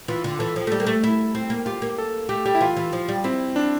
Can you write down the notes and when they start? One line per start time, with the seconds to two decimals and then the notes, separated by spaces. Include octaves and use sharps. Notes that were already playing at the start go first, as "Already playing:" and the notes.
0.08 E3 F4
0.24 D3
0.39 E3 A4
0.56 F3
0.67 A3
0.71 G3 A4
0.80 A#3
0.86 A3
1.04 E4
1.35 C4
1.50 A#3
1.66 F4 G4
1.82 A#3
1.98 A4
2.29 A3 G4
2.46 G3 G4
2.55 E4
2.61 E3 F4
2.77 E3
2.93 F3
3.08 G3
3.24 C4 E4
3.56 D4